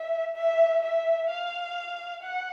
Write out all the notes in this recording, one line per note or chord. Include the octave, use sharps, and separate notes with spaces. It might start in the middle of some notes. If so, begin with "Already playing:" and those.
Already playing: E5
E5
E5
F5
F#5